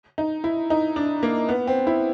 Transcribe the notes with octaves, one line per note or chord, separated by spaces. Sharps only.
D#4
E4
D#4
D4
A#3
B3
C4
E4